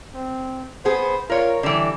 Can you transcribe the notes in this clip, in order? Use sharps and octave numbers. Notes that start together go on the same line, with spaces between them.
C4
B3 G#4 C5
F4 A#4 C#5
D3 E3 G3